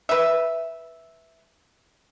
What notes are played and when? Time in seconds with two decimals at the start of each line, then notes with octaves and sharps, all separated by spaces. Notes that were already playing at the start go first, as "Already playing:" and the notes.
0.09 B4 E5